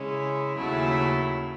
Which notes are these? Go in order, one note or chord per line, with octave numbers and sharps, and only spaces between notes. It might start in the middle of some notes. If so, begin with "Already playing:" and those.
Already playing: C#3 G#3 C#4 E4
D#2 C#3 F#3 A3 E4